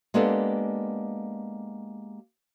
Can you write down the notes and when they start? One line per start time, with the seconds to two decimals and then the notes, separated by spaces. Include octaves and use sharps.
0.14 G#3 A#3 B3 D4 G4 A4